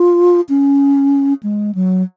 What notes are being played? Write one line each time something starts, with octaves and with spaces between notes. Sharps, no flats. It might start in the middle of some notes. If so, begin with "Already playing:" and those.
Already playing: F4
C#4
G#3
F#3